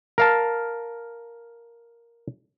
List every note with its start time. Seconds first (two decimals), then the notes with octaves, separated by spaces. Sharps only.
0.18 A#4 F5 A5